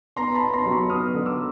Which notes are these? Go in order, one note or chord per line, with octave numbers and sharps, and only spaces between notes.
B3 A#5 C6
A5 B5
B3
A#5 C6
F#3
B5 C#6
B3 D#6 F6
D3
D6 E6